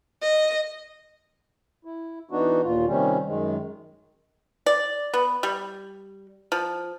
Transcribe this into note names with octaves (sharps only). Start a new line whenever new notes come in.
D#5
E4
E3 B3 D4 D#4 F#4
D#2 A#2 F4
C3 D#3 G3 C#4
F#2 D#3 G#3
D5
B3
G3
F3